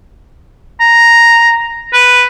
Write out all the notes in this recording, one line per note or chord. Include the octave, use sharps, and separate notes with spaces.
A#5
B4